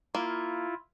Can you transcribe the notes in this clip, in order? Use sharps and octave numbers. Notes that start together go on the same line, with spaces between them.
A#3 E4 F4